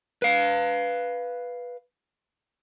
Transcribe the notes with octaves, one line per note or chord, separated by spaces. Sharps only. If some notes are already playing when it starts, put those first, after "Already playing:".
B4 F5